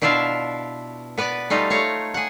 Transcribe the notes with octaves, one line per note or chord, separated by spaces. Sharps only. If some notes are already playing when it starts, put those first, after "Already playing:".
B2 D4 E4 F4 E5 F5
B3 B4 D5
G3 A3 D#4 F4
A3 C#5 F5 A#5
G#4 F#5